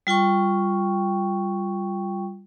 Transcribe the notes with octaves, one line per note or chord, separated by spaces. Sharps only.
G3 F4 G5 C#6